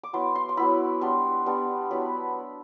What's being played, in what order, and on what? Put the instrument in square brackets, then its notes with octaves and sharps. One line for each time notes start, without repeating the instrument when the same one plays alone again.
[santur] D6
F#3 B3 E4 C6
C6
C6
F#3 B3 E4 B5
G3 B3 D4 C6
G3 B3 D4
F#3 B3 E4 B5